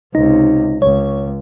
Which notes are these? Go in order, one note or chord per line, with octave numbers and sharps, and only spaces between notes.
C#2 C3 D#4
C#2 C#5